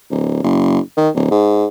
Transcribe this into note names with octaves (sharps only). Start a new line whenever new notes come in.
D1
F#1
D#3
D1
G#2